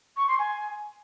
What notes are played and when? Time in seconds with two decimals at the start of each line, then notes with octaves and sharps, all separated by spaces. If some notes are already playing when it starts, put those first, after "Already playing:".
0.17 C#6
0.28 C6
0.39 G#5